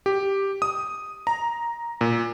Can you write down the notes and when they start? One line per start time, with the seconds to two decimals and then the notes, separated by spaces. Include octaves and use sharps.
0.06 G4
0.62 D#6
1.27 A#5
2.01 A#2